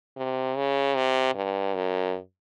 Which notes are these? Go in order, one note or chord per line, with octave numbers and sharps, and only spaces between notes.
C3
C#3
C3
G2
F#2